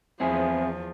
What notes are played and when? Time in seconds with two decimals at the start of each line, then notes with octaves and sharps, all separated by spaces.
0.20 E2 F3 C4 E4 G#4